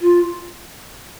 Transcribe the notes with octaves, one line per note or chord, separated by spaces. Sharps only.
F4